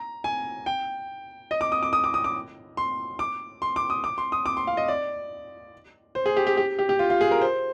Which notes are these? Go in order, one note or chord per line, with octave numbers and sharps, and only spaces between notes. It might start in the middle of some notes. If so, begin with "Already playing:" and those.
Already playing: A#5
G#5
G5
D#5
D6
D#6
D6
D#6
D6
D#6
D6
C6
D6
C6
D6
D#6
D6
C6
D#6
D6
C6
F5
D#5
D5
C5
G#4
G4
G4
G4
G4
G4
F4
F4
G#4
A#4
C5